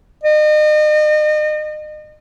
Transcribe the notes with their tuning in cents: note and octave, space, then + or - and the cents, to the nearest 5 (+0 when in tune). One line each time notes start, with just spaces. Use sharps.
D#5 -35